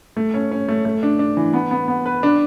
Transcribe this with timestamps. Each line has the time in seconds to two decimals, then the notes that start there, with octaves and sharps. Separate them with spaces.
0.17 A3
0.34 C#4
0.51 C#4
0.68 A3
0.85 A3
1.03 D4
1.19 D4
1.37 E3
1.53 B3
1.71 B3
1.88 B3
2.06 B4
2.23 D4